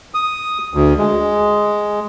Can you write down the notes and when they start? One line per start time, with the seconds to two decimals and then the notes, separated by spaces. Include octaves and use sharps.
0.14 D#6
0.74 D2
0.98 G#3